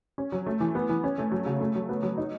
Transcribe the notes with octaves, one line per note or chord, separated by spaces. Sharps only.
C#4
F#3
A3
E3
B3
E3
C#4
A3
F#3
C#3
A3
F#3
B3
F#3
D#4